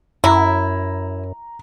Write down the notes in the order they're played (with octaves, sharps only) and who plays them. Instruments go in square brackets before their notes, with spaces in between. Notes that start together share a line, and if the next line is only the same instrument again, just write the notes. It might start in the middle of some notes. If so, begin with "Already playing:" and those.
[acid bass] F#2 [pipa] E4 [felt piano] A#5